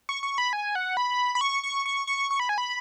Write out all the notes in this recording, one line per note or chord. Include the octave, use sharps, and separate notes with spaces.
C#6
C#6
B5
G#5
F#5
B5
B5
C#6
C#6
C#6
C#6
C#6
B5
G#5
B5